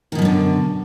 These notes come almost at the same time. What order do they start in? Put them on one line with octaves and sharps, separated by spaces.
D#3 B2 F#2 F#3 D3